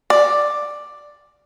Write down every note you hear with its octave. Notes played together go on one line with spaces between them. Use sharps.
D5